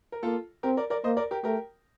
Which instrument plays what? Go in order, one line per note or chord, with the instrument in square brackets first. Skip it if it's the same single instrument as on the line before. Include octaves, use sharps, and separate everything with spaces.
[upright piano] A#4
[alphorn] A#3 [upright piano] F4 A4
[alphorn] C4 [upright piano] G4 A#4
[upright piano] A#4 D5
A#4 D5
[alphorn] A#3 [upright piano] C5 D#5
[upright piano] A#4 D5
G4 A#4
[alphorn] A3 [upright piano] G4 A#4